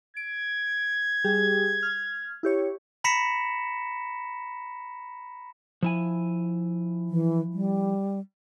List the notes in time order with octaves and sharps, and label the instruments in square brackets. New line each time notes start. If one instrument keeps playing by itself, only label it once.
[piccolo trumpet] G#6 [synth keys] D7
[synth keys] G3 G4 G#4
F6
E4 G4 C#5
[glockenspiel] A#5 B5 A#6 B6 C#7 E7
[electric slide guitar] F3 E4 G#5
[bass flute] E3
G3